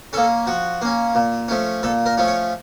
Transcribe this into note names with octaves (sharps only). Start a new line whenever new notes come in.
A#3 C#4 A4
F3 F#4
A#3 C#4
A#2
F3 A3 C#4
A#2 A4
A#4
F3 A3 C#4
C#5